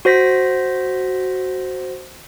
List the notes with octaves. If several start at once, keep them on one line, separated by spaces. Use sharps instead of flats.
F#4 C5 A#6 B6